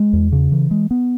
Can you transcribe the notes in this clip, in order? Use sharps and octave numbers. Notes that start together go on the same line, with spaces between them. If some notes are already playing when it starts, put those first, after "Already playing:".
Already playing: G#3
E2
C#3
E3
G#3
B3